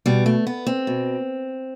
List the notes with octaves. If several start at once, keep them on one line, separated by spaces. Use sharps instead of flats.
B2 G3
A3
B3
C4
B2